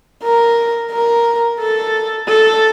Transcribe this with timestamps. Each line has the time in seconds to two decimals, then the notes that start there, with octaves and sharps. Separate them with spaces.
0.23 A#4
0.91 A#4
1.60 A4
2.28 A4